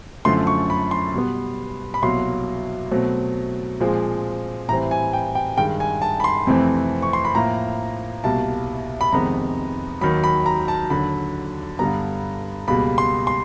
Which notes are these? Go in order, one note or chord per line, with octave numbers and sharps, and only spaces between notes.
F#2 D3 F3 A3 C6
C#6
B5
C6
B2 G3 B3
B5
C2 B2 F#3 A#3 C6
B2 F#3 A3 C4
A#2 F3 G#3 C4
A2 E3 G3 C4 A#5
G#5
G5
G5
G2 D#3 G#3 G5
G#5
A5
B5
C6
F2 C3 E3 A3 C4
C#6
C6
B5
A2 F3 A#3 A#5
C2 B2 G3 A#3 A5
B5
F2 C3 D#3 G#3 B3 A#5
D#2 D#3 F#3 B5
B5
A#5
A5
D#2 D3 F#3 B5
G2 D3 G3 B3 A#5
C#2 B2 G3 A#3 B5
C6
C6